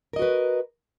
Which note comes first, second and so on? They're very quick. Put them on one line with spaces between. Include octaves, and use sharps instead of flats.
A#4 D#5 F#4 B4